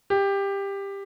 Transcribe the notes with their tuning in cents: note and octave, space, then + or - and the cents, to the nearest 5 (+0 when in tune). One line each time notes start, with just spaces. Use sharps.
G4 +15